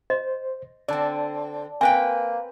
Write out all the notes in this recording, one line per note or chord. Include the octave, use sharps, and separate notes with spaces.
C5 D#5
D3 C4 D5 A5
A#3 C4 B4 G5 G#5